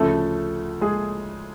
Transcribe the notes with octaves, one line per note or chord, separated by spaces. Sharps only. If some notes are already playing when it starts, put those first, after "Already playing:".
Already playing: D2 C#3 F3 A3 A4
G#3 G#4